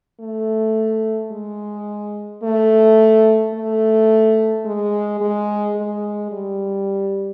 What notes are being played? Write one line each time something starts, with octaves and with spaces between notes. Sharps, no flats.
A3
G#3
A3
A3
G#3
G#3
G#3
G3